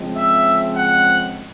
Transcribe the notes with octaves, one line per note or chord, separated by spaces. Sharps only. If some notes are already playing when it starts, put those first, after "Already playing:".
Already playing: C#3 F3 G#3 C4
E5
F#5